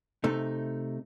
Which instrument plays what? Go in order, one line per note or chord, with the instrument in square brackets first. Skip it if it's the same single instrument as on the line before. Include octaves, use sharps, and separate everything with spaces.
[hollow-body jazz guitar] C3 A3 D#4